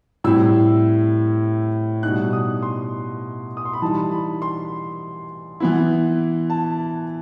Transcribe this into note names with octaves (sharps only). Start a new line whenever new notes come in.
A2 G3 C4 E4 E6
B2 G3 D#4 F#6
D#6
C6
D#6
C6
B5
E3 G3 D#4 A5
B5
C6
E3 B3 E4
A5